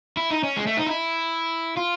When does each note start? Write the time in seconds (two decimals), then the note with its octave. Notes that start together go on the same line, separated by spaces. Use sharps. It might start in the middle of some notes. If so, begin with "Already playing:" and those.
0.17 E4
0.31 D#4
0.44 C#4
0.57 G#3
0.67 A3
0.77 D#4
0.87 E4
1.77 F4